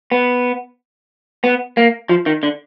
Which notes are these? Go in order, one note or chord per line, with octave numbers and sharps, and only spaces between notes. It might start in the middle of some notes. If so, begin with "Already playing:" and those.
B3
B3
A#3
F3
D#3
D3